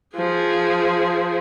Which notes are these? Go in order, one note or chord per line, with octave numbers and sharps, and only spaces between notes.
F3 G#4